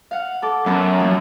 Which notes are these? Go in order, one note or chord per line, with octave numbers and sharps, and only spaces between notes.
F5 F#5
A4 A5 D6
F#2 B3 A5
F3 A#3